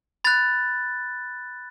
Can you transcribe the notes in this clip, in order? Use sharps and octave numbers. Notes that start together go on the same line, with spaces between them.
B5 F#6 A6